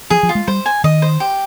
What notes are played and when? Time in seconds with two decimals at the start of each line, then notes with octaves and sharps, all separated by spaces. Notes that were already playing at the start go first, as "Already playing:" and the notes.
0.10 F3 G#4
0.23 F3
0.29 F4
0.35 G#3
0.48 G3 C5
0.66 G#5
0.84 D#3 D#5
1.02 C5
1.20 G4